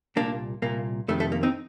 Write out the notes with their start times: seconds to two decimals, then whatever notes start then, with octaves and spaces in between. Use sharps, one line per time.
0.16 C2 A#2 A#3 D4
0.62 C2 A#2 A#3
1.08 F2 C3 D#3 A3
1.20 A3
1.32 A#3
1.43 C4 D#4